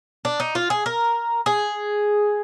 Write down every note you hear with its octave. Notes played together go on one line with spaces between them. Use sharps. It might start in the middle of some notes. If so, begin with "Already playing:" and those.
D4
D#4
F4
G#4
A#4
G#4